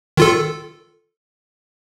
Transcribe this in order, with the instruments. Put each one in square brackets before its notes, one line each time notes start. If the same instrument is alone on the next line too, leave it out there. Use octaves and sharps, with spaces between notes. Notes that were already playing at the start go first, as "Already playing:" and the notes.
[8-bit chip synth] D#3 F4 A4